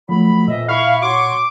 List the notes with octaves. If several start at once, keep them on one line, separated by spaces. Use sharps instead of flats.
F3 F#3 A3 B5
F2 A#2 E3 D#5 E5
E4 F5 B5 C#6
F#4 C#5 C6 D6